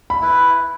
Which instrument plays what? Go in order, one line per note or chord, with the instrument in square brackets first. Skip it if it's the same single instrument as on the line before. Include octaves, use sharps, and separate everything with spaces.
[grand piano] B5
[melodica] E4 B4